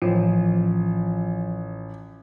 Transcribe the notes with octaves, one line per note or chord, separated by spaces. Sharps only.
A1 F3